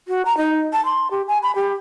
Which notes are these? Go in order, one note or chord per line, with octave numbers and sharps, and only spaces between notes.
F#4
A#5
D#4
A5
C6
G4
G#5
B5
G4